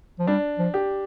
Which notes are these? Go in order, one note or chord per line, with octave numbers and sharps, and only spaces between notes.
F3
G3 D4
F3
G4